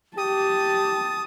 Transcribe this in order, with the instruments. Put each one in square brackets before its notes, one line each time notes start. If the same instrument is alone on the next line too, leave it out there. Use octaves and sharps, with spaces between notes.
[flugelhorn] G4 [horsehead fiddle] A5 [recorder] D#6